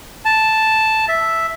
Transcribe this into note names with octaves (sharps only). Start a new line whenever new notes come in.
A5
E5